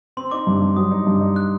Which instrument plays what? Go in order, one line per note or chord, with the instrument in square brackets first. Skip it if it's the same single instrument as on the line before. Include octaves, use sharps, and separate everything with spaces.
[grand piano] C4 [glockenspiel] C6
[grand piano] D#4 [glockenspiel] D6
[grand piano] G2
G2
[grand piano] F#3 [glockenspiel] D#6
[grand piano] D#4
G2
D#4
[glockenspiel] F#6